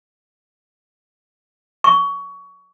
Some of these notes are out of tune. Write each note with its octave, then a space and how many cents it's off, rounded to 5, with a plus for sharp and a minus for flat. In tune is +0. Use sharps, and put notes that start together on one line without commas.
C#6 +20